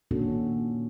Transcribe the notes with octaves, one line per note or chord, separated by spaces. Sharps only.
A#2 D#3 C#4 D4 F#4 A4